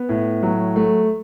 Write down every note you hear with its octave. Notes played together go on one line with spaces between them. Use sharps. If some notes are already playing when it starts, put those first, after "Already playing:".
Already playing: B3
A2
F#3
A3